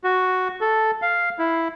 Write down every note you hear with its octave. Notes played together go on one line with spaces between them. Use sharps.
F#4
A4
F5
E4